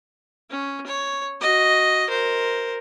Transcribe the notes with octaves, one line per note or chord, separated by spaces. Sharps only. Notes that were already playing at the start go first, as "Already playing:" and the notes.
C#4
C#5
F#4 D#5
A#4 C5